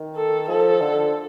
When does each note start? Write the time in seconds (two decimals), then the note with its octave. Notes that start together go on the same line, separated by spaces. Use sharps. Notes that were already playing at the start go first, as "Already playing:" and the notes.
Already playing: D#3
0.16 A4
0.48 F3 A4
0.81 D3